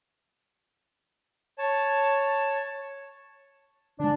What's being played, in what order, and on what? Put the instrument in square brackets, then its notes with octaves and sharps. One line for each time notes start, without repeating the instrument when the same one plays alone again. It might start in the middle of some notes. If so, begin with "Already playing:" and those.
[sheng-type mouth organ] C#5 A5
[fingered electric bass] D3 G#3 [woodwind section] D4